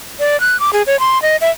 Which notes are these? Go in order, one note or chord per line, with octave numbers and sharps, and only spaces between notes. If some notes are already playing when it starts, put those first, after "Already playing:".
D5
F#6
D6
G#4
C#5
C6
D#5
E5